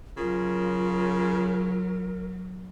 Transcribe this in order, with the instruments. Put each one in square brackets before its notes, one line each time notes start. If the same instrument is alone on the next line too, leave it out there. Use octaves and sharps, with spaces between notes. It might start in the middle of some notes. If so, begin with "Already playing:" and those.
[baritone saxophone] C#3 [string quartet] F#3 [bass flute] F4 [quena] A#4